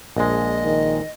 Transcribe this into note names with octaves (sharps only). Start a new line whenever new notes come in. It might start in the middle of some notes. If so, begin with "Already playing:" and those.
A#1 G#3 D#5
D#3